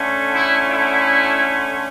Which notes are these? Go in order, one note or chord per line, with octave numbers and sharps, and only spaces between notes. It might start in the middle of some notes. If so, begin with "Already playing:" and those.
Already playing: D3 A3 C#4
E4
E4